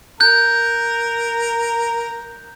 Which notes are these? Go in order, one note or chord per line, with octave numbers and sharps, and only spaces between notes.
A#4 A#5 F#6 G6